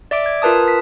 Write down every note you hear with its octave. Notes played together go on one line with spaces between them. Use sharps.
D5 E5 D6 D7
G#6
F4 A#4 B4 A5 D#6
B6